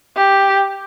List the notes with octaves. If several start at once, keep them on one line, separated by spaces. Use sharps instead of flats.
G4